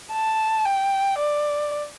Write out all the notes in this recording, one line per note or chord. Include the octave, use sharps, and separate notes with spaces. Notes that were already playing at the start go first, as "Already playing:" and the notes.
A5
G5
D5